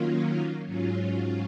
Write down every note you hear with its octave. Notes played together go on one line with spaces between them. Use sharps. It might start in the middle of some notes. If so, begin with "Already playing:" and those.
Already playing: D#3 F#3 A#3 C#4 F4
G#2 F#3 C#4 F4